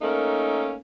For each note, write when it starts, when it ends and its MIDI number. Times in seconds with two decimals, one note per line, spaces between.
0.02 0.75 57
0.02 0.75 58
0.02 0.75 61
0.02 0.75 63
0.02 0.75 70